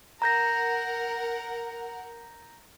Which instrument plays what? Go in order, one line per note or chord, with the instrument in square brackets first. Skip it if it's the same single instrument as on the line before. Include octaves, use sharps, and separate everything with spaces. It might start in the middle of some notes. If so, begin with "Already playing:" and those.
[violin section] A#4 F#5 [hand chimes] A#5 G6 A#6